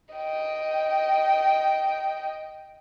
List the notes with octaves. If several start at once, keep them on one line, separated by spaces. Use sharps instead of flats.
D#5 G5